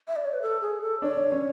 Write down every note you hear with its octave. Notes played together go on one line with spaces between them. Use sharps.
E5
D5
C#5
B4
A4
G#4
A4
D4 C#5
C#4